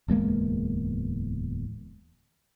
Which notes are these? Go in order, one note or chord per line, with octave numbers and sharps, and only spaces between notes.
D1 E2 G#3 A#3